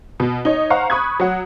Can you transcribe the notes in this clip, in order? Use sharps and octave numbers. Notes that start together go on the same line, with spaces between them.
B2
D#4 C#5
C5 F5 F#5 A#5 C#6
B5 C#6 D#6 F#6 G#6
F#3 F#5